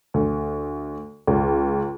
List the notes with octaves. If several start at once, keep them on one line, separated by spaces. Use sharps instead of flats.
D2
C#2